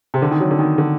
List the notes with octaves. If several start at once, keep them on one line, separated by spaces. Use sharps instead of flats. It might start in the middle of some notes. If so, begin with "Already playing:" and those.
C3
D3
D#3
F#3
D3
D#3
D3